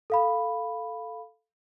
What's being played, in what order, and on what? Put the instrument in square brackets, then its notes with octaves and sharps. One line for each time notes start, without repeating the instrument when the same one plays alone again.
[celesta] A4 F5 B5